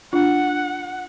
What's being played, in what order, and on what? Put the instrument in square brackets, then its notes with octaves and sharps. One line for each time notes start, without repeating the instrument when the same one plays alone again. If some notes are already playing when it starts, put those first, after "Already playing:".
[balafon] D4 F4 [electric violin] F#5